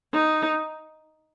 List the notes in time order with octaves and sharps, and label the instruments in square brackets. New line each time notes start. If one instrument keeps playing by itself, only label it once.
[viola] D#4